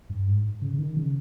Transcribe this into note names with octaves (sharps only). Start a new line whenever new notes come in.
G2
G#2
C#3
C#3
D#3
C#3